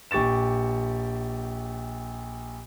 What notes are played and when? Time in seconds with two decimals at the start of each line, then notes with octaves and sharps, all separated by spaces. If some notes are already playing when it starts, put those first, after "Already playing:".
0.11 A#1 G4 C#6 A6 E7